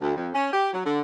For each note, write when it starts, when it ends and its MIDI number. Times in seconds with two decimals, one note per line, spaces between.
0.02 0.13 38
0.17 0.28 41
0.34 0.51 61
0.53 0.72 67
0.73 0.84 54
0.85 1.01 50